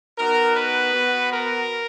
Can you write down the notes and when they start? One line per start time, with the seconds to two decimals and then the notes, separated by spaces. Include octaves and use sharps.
0.16 B3 D#4 F#4 A#4
0.54 B4
0.92 B3 F#4
1.30 A#4